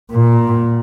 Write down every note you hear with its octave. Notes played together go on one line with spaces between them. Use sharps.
A#2